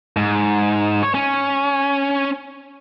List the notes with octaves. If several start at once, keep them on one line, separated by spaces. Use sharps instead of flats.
G#2
C#5
C#4